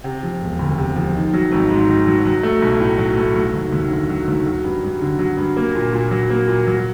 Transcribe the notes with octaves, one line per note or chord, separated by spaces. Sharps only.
C3
F3
E1
D2
C3
F3
D#3
F#3
G#1
G#2
D#3
F#3
F#3
A3
B1
A2
F#3
A3
F#3
D#2
D#2
D3
F#3
D#2
F#3
G2
G2
D3
F#3
G2
A#3
A#2
A#2
F#3
A#3
A#2
F#3